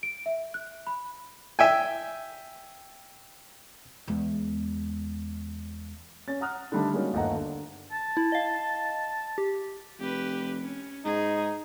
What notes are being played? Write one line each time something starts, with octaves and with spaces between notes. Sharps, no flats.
D7
E5
F#6
B5
E5 G5 G#5
E2 G#3
C#4 A6
F#5 A#5 D#6 F6 F#6
D3 D#3 G3 A3 D4
G3 G#3 A#3 C#4 D#4 F#4
G1 D#2 A3 D#5 F#5 A#5
D3
A5
E4
D#5 F5
G4
F1 G4 B4
C#4
G#2 D#4 G#4